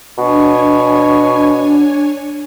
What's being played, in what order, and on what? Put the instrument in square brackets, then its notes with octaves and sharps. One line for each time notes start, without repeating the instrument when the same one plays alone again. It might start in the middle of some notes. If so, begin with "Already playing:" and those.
[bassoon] B2 [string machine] D4 C#5 G#5